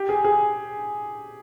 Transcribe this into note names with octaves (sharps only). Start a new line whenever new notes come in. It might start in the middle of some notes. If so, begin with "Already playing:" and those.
Already playing: G4
G#4
G#4